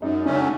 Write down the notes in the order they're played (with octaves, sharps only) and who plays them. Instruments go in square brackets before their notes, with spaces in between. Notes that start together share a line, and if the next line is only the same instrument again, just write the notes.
[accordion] F#2 [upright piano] D#4
[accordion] C#3 F#3 A3 C#4 [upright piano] D4